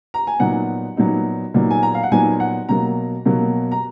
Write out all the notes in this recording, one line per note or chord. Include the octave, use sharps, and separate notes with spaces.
A#5
G#5
A#2 F#3 B3 D#4 F#5
A#2 F#3 B3 D#4
A#2 F#3 B3 D#4
G#5
A#5
F5
F#5
A#2 F#3 B3 D#4 G#5
F#5
B2 F#3 A#3 A#5
B2 F#3 A#3
A#5